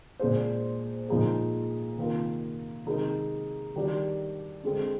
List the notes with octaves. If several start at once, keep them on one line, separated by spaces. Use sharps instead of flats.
A#2 G#3 D4 G#4 C5
A#2 F3 G#3 D#4 G#4
C3 D#3 A#3 F4 A#4
C3 D#3 G#3 D#4 A#4
D#3 G3 D4 G4
D3 G#3 C4